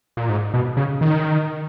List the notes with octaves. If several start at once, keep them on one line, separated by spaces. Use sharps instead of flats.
A#2
G#2
B2
C#3
D#3